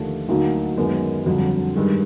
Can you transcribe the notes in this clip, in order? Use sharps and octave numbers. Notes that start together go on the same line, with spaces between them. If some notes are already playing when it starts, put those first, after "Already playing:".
Already playing: D#2 D3 F3 A3 D4
D2 D3 F#3 A#3 D#4
F#2 D#3 G#3 B3
G1 F2 D3 F#3
G2 D#3 G#3